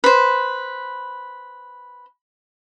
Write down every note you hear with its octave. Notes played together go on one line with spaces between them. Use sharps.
B4 C5